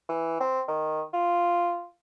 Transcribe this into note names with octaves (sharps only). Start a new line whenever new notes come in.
E3
C4
D#3
F4